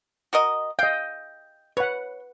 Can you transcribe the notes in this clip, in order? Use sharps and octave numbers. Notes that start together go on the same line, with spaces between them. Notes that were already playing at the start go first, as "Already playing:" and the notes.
F#4 A#4 D#5
D#5 F5 G5
B4 C#5 F#5